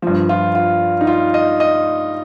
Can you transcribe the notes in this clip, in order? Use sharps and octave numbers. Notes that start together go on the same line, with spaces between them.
G2 F3
F4
F4
D#4
F4
D#5
D#5